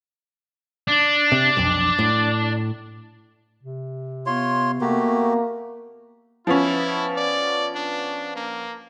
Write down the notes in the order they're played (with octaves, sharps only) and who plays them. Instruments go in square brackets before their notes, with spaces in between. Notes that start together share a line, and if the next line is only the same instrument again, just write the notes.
[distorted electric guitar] D4
[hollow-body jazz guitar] C3
B1 F2
A2
[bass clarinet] C3
[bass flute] B3 [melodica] F4 C#5 C6
[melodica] A3 F#4 G4 [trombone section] A#3 [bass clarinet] A#4
[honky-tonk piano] F3 B3 C#4 [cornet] E4
[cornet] D5
D4
A#3